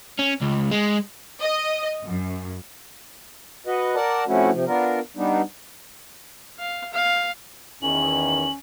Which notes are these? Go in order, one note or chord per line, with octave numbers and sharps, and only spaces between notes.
C#4
C#2
G#3
D#5
F#2
F#4 B4 D#5
A#4 D5 F#5 A5
C3 F3 A3 C#4 E4 F#4
C3 F3
B3 D4 F4 A#4
G3 B3 D4 D#4
F5
F5
E2 D#3 C#4 F#7